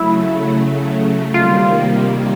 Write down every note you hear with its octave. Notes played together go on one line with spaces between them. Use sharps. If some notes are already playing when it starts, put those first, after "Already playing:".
Already playing: C#3 F#3 A3 E4
C3 D#3 G3 A#3 F4